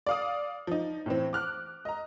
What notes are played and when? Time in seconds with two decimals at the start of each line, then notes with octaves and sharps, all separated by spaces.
0.07 D5 F5 D#6
0.67 F3 D#4
1.06 A2 E3 C4
1.33 D6 F6 F#6
1.85 D#5 A#5